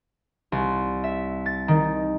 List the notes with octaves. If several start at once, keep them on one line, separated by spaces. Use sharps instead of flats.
C2
E5
A6
D#3